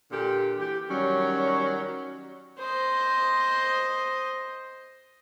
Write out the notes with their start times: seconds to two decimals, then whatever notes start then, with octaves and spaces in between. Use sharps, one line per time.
0.12 A#2 D3 G4
0.59 E3 G4
0.90 D#3 F#3 G3 C#4
2.59 C5 D#5